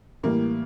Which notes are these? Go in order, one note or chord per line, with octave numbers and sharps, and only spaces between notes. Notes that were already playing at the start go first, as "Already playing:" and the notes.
A2 E3 G3 A#3